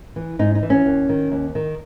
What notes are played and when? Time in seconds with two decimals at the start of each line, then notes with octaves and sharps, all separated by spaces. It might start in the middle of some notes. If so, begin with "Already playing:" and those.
0.16 E3
0.39 G#2 D#4
0.55 D#4
0.62 E3
0.70 C#4
0.86 D#2
1.09 D#3
1.32 D#2
1.55 D#3